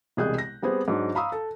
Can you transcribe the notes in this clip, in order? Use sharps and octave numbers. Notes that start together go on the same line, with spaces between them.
E1 C2 G#4 D#5 F#6 G6
A#6
G3 B3 C4 G#4
G#2 F#3 D4
F5 A#5 B5 C#6 D#6 E6
A4